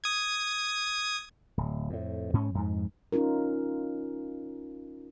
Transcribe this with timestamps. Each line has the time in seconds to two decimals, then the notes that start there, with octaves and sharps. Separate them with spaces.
0.04 D#6 G#6
1.57 D1
1.90 F2 A2
2.33 G#2 C#4
2.55 F2 G#2
3.12 C#4 D#4 F4 A#4